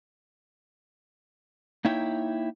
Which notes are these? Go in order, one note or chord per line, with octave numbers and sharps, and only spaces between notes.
A#3 D#4 E4 C#5 G5